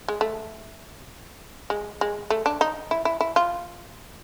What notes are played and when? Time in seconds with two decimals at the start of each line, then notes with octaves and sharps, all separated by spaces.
0.08 G#3
0.21 A3
1.70 G#3
2.01 G#3
2.30 A3
2.46 D4
2.61 D#4
2.91 E4
3.05 E4
3.21 E4
3.36 F4